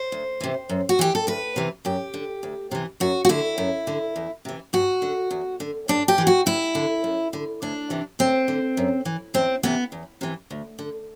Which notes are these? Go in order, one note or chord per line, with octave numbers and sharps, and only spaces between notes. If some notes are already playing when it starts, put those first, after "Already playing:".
Already playing: C5
D2
C3 E3
F#2
F#4
E3 G4
A4
D2 B4
C3 E3
F#2 G4
D3
D2
C3 E3
F#2 F#4
F#4
D3 E4
F#2
D3
E2
C3 E3
G2 F#4
D3
E2
D3
G2 D4
G4
E3
F#4
D2 E4
D3
F#2
D3
D2 D4
C3 E3
D2 C4
D3
F#2
E3
E2 C4
C3 E3 B3
E2
C3 E3
D2
D3